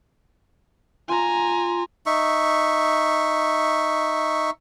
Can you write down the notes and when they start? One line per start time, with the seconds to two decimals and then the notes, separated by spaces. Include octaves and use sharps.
1.09 F4 G#5 A#5
2.06 D#4 E5 C#6